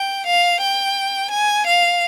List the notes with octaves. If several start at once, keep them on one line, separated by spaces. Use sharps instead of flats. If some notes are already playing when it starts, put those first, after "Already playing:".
Already playing: G5
F5
G5
G#5
F5